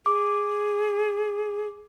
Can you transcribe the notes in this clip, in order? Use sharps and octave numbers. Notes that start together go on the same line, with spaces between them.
G#4 D6